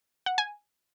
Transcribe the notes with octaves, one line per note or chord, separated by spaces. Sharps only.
F#5
G#5